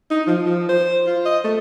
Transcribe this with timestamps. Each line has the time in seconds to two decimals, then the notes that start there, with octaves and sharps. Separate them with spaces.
0.11 D#4
0.27 F3
0.46 F3
0.69 C5
1.07 F4
1.26 D#5
1.44 A3